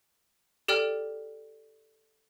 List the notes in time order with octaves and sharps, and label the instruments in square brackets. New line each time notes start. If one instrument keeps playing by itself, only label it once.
[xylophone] G4 A4 D5 G5 F6